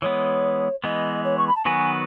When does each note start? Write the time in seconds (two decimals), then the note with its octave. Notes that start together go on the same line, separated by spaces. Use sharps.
0.02 E3 G#3 B3 C#5
0.84 E3 G#3 B3 D#5
1.24 C#5
1.38 C#6
1.47 B5
1.56 A5
1.65 D#3 F#3 B3 F#4 B4 G#5